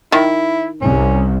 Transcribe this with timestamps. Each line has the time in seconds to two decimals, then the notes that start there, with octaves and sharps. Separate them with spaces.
0.12 D#3 E4
0.81 C2 C#4